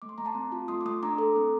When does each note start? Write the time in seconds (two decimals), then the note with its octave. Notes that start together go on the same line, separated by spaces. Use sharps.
0.02 A3 D6
0.09 C6
0.18 A3 A#5
0.25 A5 C6
0.35 C4
0.52 F4
0.68 A3 C6 D#6
0.81 D6
0.86 A3 C6 D#6
1.03 D4 A#5 D6
1.18 A4
1.36 C4